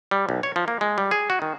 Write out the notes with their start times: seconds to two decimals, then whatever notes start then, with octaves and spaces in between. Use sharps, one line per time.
0.11 G3
0.29 B1
0.43 C#5
0.56 F3
0.68 A#3
0.81 G#3
0.98 G3
1.11 G#4
1.30 F#4
1.42 D#3